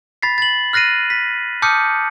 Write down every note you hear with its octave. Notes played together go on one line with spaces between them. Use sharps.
B5 A6 B6 C7
A6 F#7
F6 F#6 A#6 C7 D#7
B6
A5 D6 D#6 F6 G6 C#7